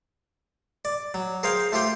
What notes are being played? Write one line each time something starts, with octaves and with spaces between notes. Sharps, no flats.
D5
F#3
G#4 A#4 C5 F5 G5
A3 F4 G4 C5 G5